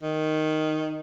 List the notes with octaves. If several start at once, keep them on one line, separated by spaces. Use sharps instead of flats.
D#3